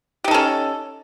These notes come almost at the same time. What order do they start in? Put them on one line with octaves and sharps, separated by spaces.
G4 D#4 A4 C#4